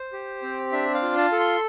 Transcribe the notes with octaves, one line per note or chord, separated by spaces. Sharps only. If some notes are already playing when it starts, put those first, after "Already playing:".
Already playing: C5
G4
C4
D4 E5
F5
F4
A5
A4
C6